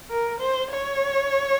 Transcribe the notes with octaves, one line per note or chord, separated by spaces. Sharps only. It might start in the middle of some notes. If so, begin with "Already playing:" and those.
A#4
C5
C#5